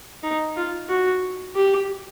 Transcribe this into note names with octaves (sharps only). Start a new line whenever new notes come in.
D#4
F4
F#4
G4